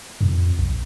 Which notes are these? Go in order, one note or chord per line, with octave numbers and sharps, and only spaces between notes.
F2
A#1